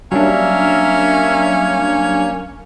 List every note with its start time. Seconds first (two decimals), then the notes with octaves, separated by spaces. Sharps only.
0.12 F#3 G3 A#3 C#4 D4 A#4 E5